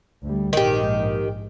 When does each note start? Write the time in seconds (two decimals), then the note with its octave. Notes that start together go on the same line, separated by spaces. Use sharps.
0.23 D2 G3
0.53 A#1 G#2 D#3 G4